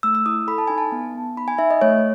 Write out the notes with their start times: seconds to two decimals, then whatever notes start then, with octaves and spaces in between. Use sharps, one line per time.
0.03 A3 E6
0.15 E6
0.26 E4 D#6
0.47 A4 B5
0.58 A5
0.68 D#4 G#5
0.78 A5
0.92 B3
1.15 B3
1.37 D#4 B5
1.48 G#5
1.58 D#4 E5
1.70 D#5
1.81 A3 C#5